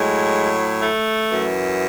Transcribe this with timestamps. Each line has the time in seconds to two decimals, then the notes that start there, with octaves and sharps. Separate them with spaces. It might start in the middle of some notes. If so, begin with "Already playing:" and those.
Already playing: A2 F#3 G#3
0.82 A3
1.29 F#2 E3